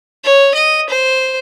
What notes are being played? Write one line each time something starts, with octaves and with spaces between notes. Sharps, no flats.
C#5
D#5
C5